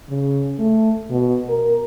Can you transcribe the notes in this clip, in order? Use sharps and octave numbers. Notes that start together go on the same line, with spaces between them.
C#3
A3
B2
A#4